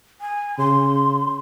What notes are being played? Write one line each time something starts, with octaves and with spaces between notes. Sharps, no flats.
G#5
C#3 C6